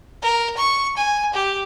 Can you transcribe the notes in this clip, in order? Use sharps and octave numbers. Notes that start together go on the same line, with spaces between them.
A#4
C#6
G#5
G4